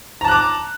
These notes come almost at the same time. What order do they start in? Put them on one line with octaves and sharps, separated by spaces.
A#5 A5 F#6 D6